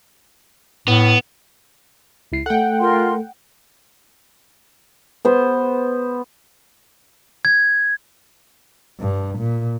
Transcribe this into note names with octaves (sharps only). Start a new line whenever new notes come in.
A2 B3
C#2 E4 C7
A3 A4 F#5 G5
F4 A#4 C6
B3 C5
G#6
G2
A#2